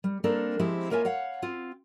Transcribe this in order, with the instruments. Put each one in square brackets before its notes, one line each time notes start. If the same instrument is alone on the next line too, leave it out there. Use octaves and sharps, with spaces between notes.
[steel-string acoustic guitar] G3
G3 A#3 C4 D4 A4 A#4
F3 G#3 C4 E4 G4
A#3 F4 C#5 E5 G#5
C#5 F5 F#5
C4 F4